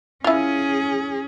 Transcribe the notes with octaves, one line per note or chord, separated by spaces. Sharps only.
C#4 E4 F4 G#4